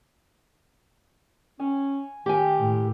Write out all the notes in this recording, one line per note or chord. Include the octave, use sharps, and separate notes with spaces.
C#4 G#5
D#3 G4 F5 G5 G#5
A2